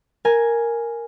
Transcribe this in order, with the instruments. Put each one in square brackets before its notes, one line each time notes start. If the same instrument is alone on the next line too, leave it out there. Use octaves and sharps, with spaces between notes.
[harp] A#4 G#5